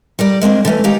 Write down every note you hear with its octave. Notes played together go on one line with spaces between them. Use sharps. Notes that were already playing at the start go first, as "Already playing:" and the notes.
G3 A#4 D5
G#3 A#3 C4 D4
D3 E3 A3 C#4
D#2 G#3 D#4 G4 F5